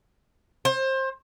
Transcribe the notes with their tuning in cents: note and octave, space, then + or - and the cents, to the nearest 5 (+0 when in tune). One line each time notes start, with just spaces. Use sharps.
C5 +25